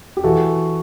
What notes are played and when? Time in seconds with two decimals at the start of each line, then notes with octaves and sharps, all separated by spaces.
0.17 G4
0.24 E3 F#4 A4